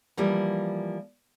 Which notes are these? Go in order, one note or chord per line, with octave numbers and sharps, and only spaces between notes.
E3 F3 G3 A#3